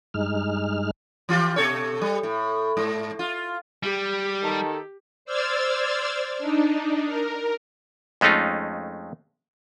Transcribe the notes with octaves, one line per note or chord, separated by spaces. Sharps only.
G2 G#3 D#4 F6
E3 F4 G4
B2 A4 C#5
G3
A2
G#2
F4
G3 G4
D#3 A4
C5 D5 E6 F6 G#6 A6
D4 D#4
A#4
F2 G#3 A3 C#4 D#4 F4